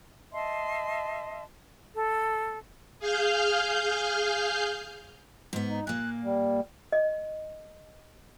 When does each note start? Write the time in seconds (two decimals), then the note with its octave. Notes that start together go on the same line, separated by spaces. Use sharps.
0.33 D#5 E5 A5 C6
1.96 A4
2.99 G#4 F5 F6 G6
5.53 G#2 B3
5.70 D#4
5.87 A#2 A#3 F#6
6.24 G3
6.92 D#5